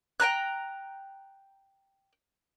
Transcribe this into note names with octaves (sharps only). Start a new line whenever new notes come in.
G5 G#5 A#5 F#6